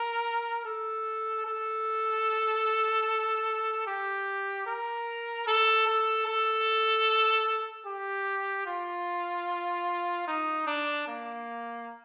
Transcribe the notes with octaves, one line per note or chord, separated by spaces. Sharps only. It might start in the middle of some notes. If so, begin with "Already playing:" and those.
Already playing: A#4
A4
A4
G4
A#4
A4
A4
A4
G4
F4
D#4
D4
A#3